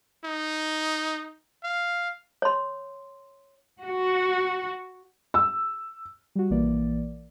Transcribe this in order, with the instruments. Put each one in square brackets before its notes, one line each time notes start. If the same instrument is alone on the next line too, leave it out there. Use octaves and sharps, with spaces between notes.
[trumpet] D#4
F5
[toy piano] C#5 C6
[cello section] F#4
[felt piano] E6
[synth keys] G3 F#4
A#1 E3 A#3 D5